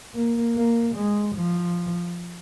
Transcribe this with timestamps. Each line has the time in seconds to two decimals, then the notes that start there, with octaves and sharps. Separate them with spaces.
0.15 A#3
0.56 A#3
0.96 G#3
1.36 F3